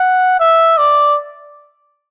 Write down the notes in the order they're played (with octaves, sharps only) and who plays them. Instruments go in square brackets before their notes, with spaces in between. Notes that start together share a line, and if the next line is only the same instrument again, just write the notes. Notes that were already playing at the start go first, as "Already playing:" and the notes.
Already playing: [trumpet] F#5
E5
D5